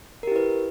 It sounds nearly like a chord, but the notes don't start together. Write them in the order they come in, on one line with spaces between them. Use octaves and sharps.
A#4 G4 E4 B4